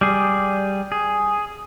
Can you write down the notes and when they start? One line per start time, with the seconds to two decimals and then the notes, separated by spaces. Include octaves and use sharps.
0.01 G3 G#4
0.92 G#4